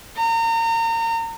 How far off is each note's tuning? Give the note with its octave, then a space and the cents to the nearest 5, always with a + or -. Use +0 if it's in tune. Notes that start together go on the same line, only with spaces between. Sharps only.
A#5 -30